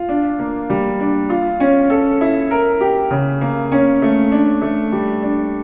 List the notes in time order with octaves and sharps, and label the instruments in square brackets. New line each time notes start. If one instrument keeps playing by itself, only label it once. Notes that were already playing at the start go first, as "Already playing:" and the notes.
Already playing: [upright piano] F4
D4
A#3
G3
D4
F4
C#4
A4
E4
A#4
G4
C#3
A#3
C#4
A3
D4
A3
G3
D4